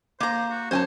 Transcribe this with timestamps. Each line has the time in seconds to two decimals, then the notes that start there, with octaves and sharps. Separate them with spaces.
0.20 A#3 C5 A#5
0.51 F#4
0.71 F#2 C5 C#5 G#5 A5